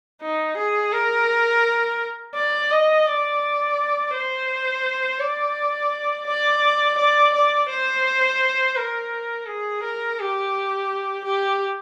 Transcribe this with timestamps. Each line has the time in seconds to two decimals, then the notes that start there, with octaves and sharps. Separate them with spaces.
0.22 D#4
0.57 G#4
0.93 A#4
2.35 D5
2.71 D#5
3.06 D5
4.14 C5
5.20 D5
6.27 D5
6.98 D5
7.34 D5
7.69 C5
8.77 A#4
9.47 G#4
9.83 A#4
10.19 G4
11.25 G4